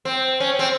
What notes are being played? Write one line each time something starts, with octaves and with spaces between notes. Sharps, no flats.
C4
C#4
C4